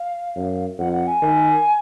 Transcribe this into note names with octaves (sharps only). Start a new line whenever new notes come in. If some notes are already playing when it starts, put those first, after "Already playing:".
Already playing: F5
F#2
F2 F#5
F#5
G#5
D#3